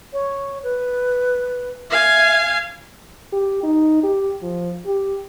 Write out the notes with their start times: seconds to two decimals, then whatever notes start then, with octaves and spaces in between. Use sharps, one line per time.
0.13 C#5
0.64 B4
1.91 E5 F5 G#5
3.32 G4
3.63 D#4
4.03 G4
4.42 F3
4.86 G4